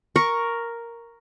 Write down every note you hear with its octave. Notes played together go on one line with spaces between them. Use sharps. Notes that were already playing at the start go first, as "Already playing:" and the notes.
A#4 C#6